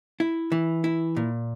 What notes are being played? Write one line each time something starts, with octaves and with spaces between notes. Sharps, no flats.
E4
E3
E4
A#2